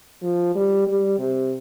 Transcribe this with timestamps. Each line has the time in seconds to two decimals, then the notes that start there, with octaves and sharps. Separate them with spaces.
0.23 F3
0.55 G3
0.87 G3
1.19 C3